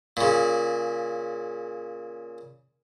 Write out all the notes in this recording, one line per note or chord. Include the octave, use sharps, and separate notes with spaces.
A#2 C#3